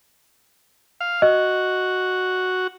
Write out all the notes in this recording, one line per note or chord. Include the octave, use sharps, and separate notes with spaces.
F5
F#4 D#5